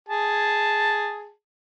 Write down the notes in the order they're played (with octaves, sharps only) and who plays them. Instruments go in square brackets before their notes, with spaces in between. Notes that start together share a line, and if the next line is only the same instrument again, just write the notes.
[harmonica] G#4 A5